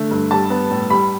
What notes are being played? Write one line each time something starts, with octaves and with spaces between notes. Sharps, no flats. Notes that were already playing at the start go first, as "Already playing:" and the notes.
Already playing: D3 A3
G2
G3 A5
B3
A2
G3 B5